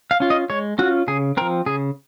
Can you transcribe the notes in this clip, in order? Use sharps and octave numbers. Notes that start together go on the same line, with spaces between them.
F5
C#4 F4
D#5
G#3 C#5
C#4 F4 F#4
C#3 G#4
F3 C4 A#4
C#3 G#4